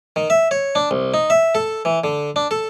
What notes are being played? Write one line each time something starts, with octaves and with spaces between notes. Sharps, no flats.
D#3
E5
C#5
D4
C2
D#4
E5
A4
E3
D3
D4
A4